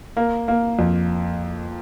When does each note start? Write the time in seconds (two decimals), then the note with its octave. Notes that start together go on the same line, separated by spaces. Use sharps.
0.17 A#3
0.48 A#3
0.79 F2